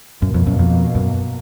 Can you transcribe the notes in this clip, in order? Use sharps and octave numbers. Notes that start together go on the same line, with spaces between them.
F#2 B2 A#3
F2
F#2
F2
F#2